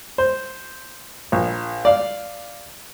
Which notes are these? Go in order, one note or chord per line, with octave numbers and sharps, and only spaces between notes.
C5
A#1
D5 F5